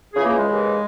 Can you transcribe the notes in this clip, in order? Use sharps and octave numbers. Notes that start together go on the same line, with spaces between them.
C#2 C#3 E3 G#4
A#3
G#3
D#2 C#3 E3